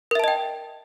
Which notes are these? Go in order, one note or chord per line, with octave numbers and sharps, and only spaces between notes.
A#4 D#5 E5 G5 A5